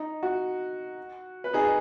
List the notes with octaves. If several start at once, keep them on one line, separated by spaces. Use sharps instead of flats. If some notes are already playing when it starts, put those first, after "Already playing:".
Already playing: D#4
F#4
B4
D#4 G#4